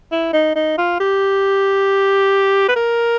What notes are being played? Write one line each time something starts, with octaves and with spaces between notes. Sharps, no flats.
E4
D#4
D#4
F4
G4
B4
A#4